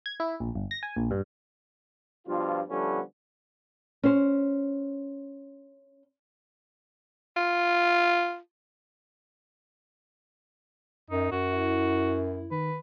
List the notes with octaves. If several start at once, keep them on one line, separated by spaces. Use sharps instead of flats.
G#6
E4
A#1
G1
A#6
G#5
A#1
G2
G2 B2 F3 F4
D3 F3 G3 A3 B3 C#4
C#4 C5
F4
F#2 D#4
F#2 F#4
E4
D#3 B4